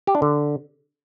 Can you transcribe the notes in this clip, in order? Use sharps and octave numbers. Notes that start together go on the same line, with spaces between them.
G4
D4
D3